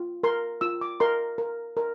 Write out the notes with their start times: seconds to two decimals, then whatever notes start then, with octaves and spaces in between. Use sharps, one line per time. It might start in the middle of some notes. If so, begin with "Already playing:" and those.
Already playing: F4
0.23 A#4 C6
0.61 F4 E6
0.81 D6
1.00 A#4 C6
1.38 A#4
1.77 A#4